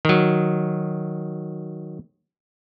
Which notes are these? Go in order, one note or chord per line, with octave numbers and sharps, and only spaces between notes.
D#3 F#3